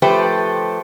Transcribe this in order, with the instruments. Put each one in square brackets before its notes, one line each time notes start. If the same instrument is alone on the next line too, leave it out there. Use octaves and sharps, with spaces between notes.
[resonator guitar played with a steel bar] F3 A3 G4 B4 C5